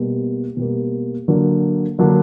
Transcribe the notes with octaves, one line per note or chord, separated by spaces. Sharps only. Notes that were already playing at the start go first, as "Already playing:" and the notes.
Already playing: B2 G3 A#3
B2 G3 A#3
D3 F#3 A#3 D4
D3 F#3 A#3 D4